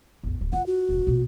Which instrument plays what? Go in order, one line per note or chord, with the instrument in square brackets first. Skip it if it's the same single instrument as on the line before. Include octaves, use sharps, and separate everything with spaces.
[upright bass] A1 E2
D1
[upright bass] E4 F4 [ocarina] F#5
[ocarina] F#4
[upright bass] D#1 A#1
A#1 B2